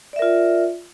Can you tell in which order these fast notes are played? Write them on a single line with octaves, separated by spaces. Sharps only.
D5 E5 A#4 F4